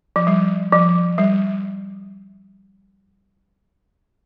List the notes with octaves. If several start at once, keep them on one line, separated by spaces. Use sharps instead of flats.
F3
G3
F3
G3